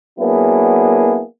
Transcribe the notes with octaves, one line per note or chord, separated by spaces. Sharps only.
F#3 A#3 B3 D4 E4 G#4